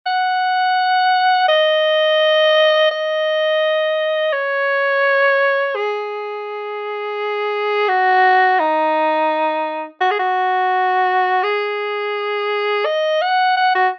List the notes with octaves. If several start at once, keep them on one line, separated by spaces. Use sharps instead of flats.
F#5
D#5
D#5
C#5
G#4
F#4
D#4
F#4
G#4
F#4
G#4
D#5
F#5
F#5
F#4